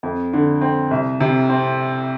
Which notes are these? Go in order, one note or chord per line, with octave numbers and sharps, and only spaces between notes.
F2
D3
C4
C2
C3
C4